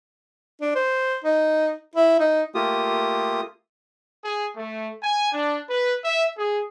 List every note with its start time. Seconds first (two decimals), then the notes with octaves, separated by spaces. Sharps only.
0.61 D4
0.75 C5
1.24 D#4
1.95 E4
2.20 D#4
2.55 A3 A#3 F4 G4 D#6
4.23 G#4
4.56 A3
5.02 G#5
5.33 D4
5.69 B4
6.04 E5
6.37 G#4